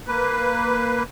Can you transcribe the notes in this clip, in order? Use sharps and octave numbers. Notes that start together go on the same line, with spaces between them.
A#3 B4